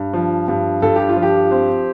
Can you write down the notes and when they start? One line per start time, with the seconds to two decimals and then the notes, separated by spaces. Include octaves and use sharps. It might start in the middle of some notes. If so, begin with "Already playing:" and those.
Already playing: G2
0.14 F3
0.48 G2
0.82 G2 A4
0.96 G4
1.09 F4
1.16 F3
1.22 G4
1.51 C4